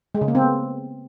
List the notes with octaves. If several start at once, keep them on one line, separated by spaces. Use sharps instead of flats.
G#3
C#3
A#3
C4
B3